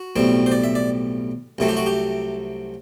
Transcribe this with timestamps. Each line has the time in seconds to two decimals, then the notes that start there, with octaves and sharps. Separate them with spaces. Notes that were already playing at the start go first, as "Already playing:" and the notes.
Already playing: F#4
0.16 B1 A2 G3 C4
0.46 C5
0.52 D5
0.64 E5
0.75 D5
1.58 C2 C3 F#3 A3 C4
1.69 G4
1.77 F#4
1.86 G4